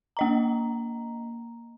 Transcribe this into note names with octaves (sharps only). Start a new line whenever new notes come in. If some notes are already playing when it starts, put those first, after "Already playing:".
A#3 D#5 A#5